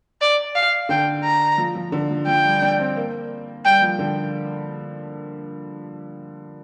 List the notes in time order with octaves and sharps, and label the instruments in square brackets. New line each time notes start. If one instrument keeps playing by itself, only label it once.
[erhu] D5
F5
[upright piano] D3 [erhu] G5
[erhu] A#5
[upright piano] F3
F3
D3
F3
[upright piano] F3 [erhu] G5
[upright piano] G3
D4
C4
A#3
[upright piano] G3 [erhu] G5
[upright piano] F3
D3